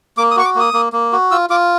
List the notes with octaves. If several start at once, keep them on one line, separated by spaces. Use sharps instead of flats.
A#3 D6
D#6
F#4 C#6
D6
A#3 D#6
A#3
A#3
F#4
F4 E6
F4 D6